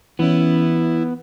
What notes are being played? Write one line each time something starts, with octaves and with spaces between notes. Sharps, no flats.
E3 B3 C#4 E4